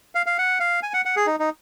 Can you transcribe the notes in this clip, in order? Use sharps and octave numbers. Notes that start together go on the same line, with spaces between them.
F5
F5
F#5
F5
G#5
F#5
F#5
G#4
D#4
D#4